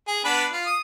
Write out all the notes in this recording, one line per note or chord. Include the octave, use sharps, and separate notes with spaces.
G#4
B3 D4 B4
F4
D#6